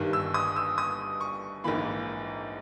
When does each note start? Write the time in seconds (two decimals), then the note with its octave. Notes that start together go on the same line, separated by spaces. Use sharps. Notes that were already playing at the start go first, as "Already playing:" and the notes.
Already playing: G1 G2 D#3 G3
0.13 E6
0.34 D#6
0.56 E6
0.78 D#6
1.21 C#6
1.64 A#1 G#2 E3 A#3 B5